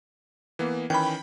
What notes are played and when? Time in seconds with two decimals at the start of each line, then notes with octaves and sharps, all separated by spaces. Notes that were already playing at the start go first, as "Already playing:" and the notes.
0.59 E3 A#3 B3
0.90 D#3 E3 C#4 G5 B5